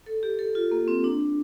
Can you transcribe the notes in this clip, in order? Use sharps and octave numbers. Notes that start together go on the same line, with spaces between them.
A4
G4
A4
F4
A#3
C4
D4